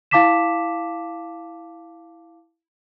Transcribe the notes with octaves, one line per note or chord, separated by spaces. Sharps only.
E4 F5 A5 D6 B6 E7